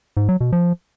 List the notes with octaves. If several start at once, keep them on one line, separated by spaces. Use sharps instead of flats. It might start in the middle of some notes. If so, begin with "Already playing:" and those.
G#2
F#3
B2
F3